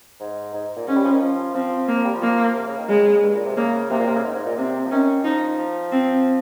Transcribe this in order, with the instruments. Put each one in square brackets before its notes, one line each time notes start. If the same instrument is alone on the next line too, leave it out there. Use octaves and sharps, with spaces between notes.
[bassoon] G#2
G#2
A#2
[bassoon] G#2 [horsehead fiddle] C#4
[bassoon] G3
F3
D#3
F3
[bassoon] F3 [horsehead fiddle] C4
[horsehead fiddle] A#3
[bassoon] F3
G3
F3
[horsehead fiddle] A#3
[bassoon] C3
C#3
D#3
[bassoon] C#3 [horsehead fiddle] G#3
[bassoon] G2
A#2
C3
[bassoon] C#3 [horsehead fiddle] A#3
[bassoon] C3 [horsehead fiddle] A#3
[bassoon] A#2
C3
C#3
G#2
G#2
A#2
[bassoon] C3 [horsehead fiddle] C4
[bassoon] F3
[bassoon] D#3 [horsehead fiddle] C#4
[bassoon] F3 [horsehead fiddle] D#4
[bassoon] F3
[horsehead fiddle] C4